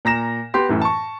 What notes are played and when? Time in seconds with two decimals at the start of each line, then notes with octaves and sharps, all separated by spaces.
0.05 A#2 A#5 A#6 E7
0.54 B3 G4 C6
0.69 F#2 A2 E3
0.82 A5 C#6